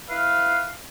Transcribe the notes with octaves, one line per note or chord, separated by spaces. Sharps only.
E4 B4 F5